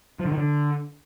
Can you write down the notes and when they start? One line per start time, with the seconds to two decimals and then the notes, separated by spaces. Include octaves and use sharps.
0.19 F3
0.25 D3
0.32 D#3
0.38 D3